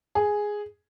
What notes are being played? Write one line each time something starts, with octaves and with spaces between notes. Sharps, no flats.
G#4